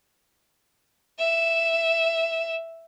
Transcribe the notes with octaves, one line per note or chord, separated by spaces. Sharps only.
E5 E7